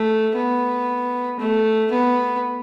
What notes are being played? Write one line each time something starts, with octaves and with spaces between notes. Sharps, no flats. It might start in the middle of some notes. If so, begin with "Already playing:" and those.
Already playing: A3
B3
A3
B3